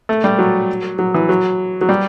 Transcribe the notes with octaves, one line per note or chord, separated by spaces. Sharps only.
A3
G3
F#3
F#3
E3
F#3
F#3
G3